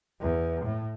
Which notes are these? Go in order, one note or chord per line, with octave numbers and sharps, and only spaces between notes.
E2
A2